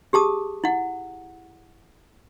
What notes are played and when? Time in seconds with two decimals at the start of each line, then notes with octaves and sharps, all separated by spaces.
0.13 G4 G#4 A5 D#6
0.64 E4 F#5